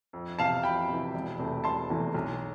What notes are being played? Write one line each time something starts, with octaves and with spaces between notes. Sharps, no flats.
F2
C3 E3 F5 A5
F2 G5 B5
C3 E3
E1
E2 C3 E3 A3
E1 A5 C6
E2 C3 E3 A3
B1